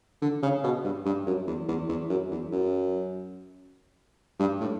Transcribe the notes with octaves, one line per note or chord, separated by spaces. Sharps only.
D3
C#3
B2
G2
G2
F#2
E2
E2
E2
F#2
E2
F#2
G2
A2